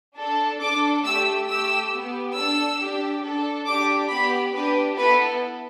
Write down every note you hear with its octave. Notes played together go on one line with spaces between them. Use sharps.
D4 A4
D4 A4 D6
A3 G4 E6
A3 G4 E6
B3 G4
D4 A4 E6
D4 G4
D4 A4
D4 G4 D6
B3 G4 B5
D4 G4 B4
B3 E4 A4 B4